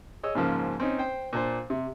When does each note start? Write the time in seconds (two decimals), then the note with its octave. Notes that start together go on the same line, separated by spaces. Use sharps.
0.23 G#4 C#5 D#5 E6
0.35 G#2 C#3 F3 A#3
0.80 C4 C#4 D#4
0.99 C5 G5
1.33 A#2 D4 C5
1.70 C3